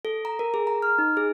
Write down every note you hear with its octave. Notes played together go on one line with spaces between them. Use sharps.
A4
A#5
A#4
G#4
A#5
F6
D#4
G#4